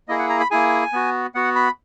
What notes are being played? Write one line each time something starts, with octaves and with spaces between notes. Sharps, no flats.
A#3 E4 G#4 D#5
F#5
A#5
B5
A#3 E4 G#4 G#5
B3 F#4
B3 F#4 F#5
B5